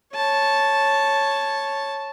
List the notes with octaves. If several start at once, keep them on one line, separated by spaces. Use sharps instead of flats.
C#5 A5